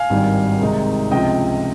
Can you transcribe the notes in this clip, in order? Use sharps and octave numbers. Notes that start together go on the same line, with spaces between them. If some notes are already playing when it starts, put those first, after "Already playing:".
Already playing: F5 G#5
G#1 G2 D#3 G3
C2 C3 D#3 G#3 D#4
C#2 C3 F3 D#5 G5